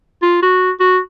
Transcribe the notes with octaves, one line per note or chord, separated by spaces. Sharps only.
F4
F#4
F#4